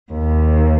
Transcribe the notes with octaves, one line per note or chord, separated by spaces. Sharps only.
D#2